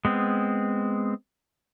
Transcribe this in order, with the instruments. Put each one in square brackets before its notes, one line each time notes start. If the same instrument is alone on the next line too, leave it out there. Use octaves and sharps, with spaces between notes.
[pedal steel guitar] G#3 B3 C4